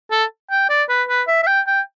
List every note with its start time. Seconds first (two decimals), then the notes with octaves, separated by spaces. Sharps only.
0.11 A4
0.51 G5
0.69 D5
0.89 B4
1.09 B4
1.28 E5
1.43 E5
1.47 G5
1.67 G5